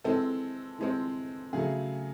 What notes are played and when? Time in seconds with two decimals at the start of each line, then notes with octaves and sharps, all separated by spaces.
0.04 E3 G#3 C4 A4
0.78 E3 G#3 C4
1.53 C#3 F#3 A3 G#4